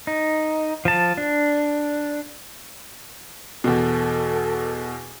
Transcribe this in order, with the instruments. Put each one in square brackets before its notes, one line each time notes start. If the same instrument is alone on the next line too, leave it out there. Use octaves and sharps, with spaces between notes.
[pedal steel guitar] D#4
F3 A5
D4
[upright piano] E2 B2 [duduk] A4